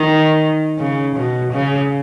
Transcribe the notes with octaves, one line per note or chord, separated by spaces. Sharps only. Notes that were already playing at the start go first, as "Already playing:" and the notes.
Already playing: D#3
C#3
B2
C#3